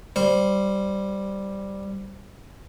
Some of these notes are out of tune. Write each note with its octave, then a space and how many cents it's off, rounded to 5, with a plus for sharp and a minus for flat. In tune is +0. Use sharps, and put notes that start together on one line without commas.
G3 +0 C5 +0